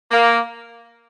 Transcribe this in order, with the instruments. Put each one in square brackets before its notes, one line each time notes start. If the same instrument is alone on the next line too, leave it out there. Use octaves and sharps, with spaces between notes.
[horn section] A#3